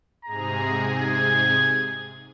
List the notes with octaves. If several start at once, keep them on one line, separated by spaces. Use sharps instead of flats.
G#2 C3 G#4 A#5
G#6